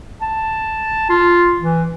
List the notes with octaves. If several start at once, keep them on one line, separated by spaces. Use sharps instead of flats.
A5
F4
E3